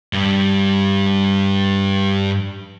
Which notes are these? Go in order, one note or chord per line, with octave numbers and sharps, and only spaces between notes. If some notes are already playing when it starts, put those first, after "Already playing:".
G2 G3